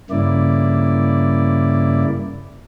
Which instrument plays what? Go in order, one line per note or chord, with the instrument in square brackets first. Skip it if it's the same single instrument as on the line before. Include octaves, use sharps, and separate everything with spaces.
[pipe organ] G2 C#3 A#3 E4 D5